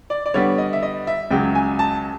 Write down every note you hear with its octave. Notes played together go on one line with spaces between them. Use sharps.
D5
D5
D3 G3 B3 C#5
D#5
E5
D#5
E5
C#2 C#3 F#3 G5
G#5
A5